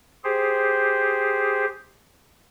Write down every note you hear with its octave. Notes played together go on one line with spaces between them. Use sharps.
G4 G#4 C5